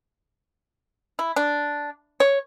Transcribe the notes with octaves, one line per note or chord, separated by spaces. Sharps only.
E4
D4
C#5